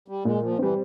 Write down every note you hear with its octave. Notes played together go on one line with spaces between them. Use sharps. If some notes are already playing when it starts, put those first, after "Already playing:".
G3
A#2 G#3
F3
E3 G3 C4